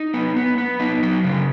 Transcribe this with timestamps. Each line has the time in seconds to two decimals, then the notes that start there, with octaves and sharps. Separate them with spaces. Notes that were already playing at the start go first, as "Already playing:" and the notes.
Already playing: D#4
0.14 B3
0.36 B3
0.58 B3
0.80 D#4
1.03 F#3
1.24 C#3